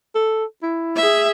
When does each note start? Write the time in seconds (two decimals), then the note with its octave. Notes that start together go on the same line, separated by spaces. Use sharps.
0.15 A4
0.63 E4
0.96 G#4 E5